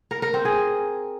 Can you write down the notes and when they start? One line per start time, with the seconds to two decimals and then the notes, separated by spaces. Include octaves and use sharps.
0.11 A#4
0.22 A#4
0.34 C4
0.45 G#4